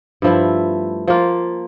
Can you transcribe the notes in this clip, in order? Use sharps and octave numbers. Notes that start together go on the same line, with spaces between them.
G2 F3 A3 E4
F3 A#3 F4